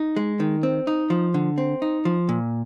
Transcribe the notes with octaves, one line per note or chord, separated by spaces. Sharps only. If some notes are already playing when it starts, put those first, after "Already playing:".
Already playing: D#4
G#3
D#3
C4
D#4
F3
D3
C4
D#4
F3
A#2